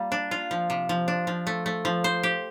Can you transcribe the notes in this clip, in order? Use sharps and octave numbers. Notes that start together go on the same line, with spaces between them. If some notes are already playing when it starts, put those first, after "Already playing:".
Already playing: G3 A#3 F4
D4
F4
F3
C3
F3
D4
F3
A3
A3
F3
C5
G4